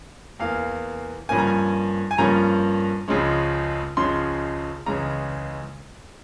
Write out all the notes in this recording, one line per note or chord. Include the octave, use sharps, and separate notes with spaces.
E2 E3 A#3 F5
G2 F3 A#3 C#4 G#5
A#5
G#5
G#5
G2 F3 A#3 C#4 A#5
C#2 C#3 F3 G#3 C#4
C#2 C#3 F3 G#3 C#4 C6
C#2 C#3 E3 G#3 C#4 A#5